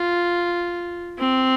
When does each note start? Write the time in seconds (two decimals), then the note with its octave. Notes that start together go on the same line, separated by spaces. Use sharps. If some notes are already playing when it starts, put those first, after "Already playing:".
Already playing: F4
1.18 C4